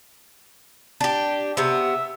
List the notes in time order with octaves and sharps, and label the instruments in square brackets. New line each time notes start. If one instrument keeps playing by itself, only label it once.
[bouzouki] D4 G4
[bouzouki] C3 B3 [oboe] E5